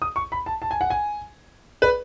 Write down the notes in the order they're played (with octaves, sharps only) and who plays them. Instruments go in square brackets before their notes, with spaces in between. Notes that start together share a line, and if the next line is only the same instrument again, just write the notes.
[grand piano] D#6
C#6
B5
A5
A5
G#5
F#5
G#5
B4